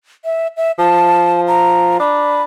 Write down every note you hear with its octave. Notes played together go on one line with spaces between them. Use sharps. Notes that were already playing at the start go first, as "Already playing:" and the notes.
E5
E5
F3 A5
A#5
D4 B5